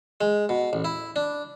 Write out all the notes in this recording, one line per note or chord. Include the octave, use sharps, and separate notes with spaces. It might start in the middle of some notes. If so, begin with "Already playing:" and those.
G#3
B2
A1
E4
D4